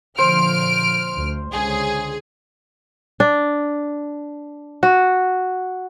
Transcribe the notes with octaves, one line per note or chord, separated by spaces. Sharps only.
A#2 D3 F3 C5 F6 D7
D2
C#2 D3 C#4 G#4
D4
F#4